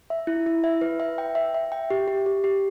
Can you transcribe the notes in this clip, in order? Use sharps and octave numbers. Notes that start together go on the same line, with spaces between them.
E5
E4
E4
E5
B4
E5
G5
E5
E5
G5
G4
G4
G4
G4